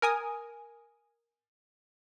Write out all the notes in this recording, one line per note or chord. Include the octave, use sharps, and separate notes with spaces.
A#4 G#5 D#6